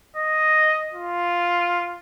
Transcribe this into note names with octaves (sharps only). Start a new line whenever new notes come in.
D#5
F4